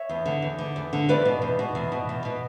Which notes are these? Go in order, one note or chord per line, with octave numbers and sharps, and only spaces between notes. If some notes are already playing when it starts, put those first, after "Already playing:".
Already playing: C#5 E5
E2
D3
E2
D3
E2
D3
E2 B4 D5
B2
E2
B2
E2
B2
E2
B2